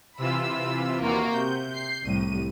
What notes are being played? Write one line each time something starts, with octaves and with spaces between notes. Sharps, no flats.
C3 E3 F4 B5 E6
D#2 A#3 F#4
C3 G6
C7
C2 A2 D#7